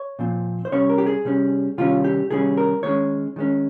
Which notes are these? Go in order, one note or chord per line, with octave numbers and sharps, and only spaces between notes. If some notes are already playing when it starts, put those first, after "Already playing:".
Already playing: C#5
A#2 F3 C4
C5
C3 G3 C#4 C#5
A#4
G4
G#4
C3 G3 C#4
C3 D#3 G3 C#4 F4
G4
C3 D#3 G3 C#4 G#4
A#4
D#3 G#3 C#4 C#5
D#3 G#3 C#4